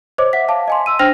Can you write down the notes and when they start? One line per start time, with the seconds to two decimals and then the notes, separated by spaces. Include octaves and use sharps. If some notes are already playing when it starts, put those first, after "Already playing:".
0.18 C5 C#5 D#5 D6
0.33 E5 F#5 B6
0.48 F5 A5 D6
0.68 D#5 G#5 C6
0.86 C6 E6 D#7
0.99 D4 C5 G5 F6 A#6 F7